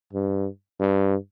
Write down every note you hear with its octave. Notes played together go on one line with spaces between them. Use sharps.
G2
G2